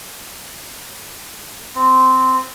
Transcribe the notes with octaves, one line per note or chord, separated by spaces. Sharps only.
C4